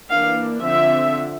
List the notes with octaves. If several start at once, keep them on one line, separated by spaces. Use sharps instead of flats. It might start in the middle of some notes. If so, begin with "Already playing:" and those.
E3 A#3 D4 F5
D3 F3 C4 E5